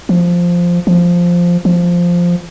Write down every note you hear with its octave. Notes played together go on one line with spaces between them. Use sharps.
F3
F3
F3